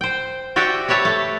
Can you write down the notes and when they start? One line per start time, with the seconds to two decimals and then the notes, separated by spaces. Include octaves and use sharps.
0.01 C5 G5
0.56 F#4 G4 D5 E5 F#5 G5
0.88 G4 B4 C#5 E5 A5
1.05 A3